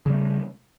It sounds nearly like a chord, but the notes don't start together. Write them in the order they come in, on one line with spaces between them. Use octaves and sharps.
C#3 G3 A3